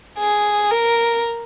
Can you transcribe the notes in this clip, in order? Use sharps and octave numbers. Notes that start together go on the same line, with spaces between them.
G#4
A#4